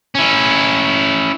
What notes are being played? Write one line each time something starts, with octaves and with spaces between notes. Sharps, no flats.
C#4 E4